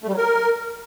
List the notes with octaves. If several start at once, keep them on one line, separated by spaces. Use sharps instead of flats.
A3
G3
F#3
A#4